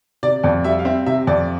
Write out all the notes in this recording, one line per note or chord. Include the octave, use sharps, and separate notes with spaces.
C3 D5
F2 D5
G3 E5
F5
C4 E5
C3 E5
F2 D5